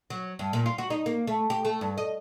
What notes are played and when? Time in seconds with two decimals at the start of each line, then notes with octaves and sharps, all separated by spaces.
0.10 F#3
0.39 G2
0.53 A#2
0.66 F4
0.78 F#4
0.90 D#4
1.06 A#3
1.27 A3
1.50 G4
1.65 A3
1.81 G2
1.98 D#5